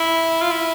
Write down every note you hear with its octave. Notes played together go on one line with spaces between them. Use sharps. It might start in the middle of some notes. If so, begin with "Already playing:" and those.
Already playing: E4
F4
E4